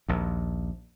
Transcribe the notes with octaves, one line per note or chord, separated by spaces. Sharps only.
A#1 D#2